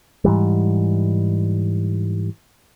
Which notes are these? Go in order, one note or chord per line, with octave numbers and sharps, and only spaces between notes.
G#2 E3 G3